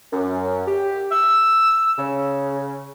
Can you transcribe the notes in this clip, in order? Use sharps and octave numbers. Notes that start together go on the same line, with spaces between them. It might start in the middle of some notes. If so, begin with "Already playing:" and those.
F#2
G4
E6
C#3